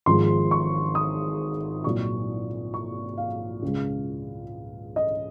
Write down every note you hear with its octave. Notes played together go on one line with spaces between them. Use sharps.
G#1 G#2 F3 G#3 C6
C#6
D#6
C2 A#2 F#3 C#6
C#6
F5
C#2 C#3 G#3
D#5